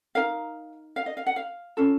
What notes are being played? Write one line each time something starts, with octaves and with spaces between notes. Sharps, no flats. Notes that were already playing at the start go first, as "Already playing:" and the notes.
D#4 A#4 F5
F5
D#5
F5
F#5
F5
C#4 F4 A4